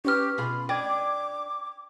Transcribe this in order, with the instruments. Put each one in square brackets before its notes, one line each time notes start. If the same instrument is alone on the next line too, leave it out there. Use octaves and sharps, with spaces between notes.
[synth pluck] C#4 B4 D6 [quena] G4 [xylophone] C#6 F6
[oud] B2 F4 G#4 [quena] B5
[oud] D4 D#5 [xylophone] G5 [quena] D6 [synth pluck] G#6